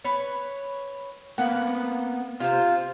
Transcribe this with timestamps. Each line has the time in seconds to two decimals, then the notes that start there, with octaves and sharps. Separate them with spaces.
0.05 B4 C#5
1.38 A#3 B3 F#5
2.40 C3 F4 C5